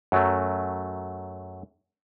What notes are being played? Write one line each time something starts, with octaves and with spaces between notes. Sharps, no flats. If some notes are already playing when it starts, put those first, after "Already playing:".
F#2 F#3 A3